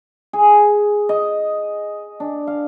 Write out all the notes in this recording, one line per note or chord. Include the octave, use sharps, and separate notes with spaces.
G#4
D#5
D4
F5